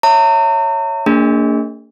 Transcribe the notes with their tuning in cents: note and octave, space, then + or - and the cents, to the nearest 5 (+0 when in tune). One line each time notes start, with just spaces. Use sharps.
C#5 +0 E5 +0 A#5 -40
A#3 -40 D4 -30 G#4 -25